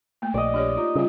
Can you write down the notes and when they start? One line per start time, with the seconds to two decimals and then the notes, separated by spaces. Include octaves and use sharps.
0.22 A3 A#3
0.34 A#1 D5 D#5
0.54 D4 G4 C#5
0.77 D#4 F4
0.95 C#3 G3 F4